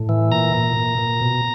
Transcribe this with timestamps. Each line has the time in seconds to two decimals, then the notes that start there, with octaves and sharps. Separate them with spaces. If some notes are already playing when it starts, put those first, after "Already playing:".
Already playing: A2
0.09 E3
0.31 A#2 A#5
0.55 A#2
0.77 A#2
0.99 A#2
1.22 B2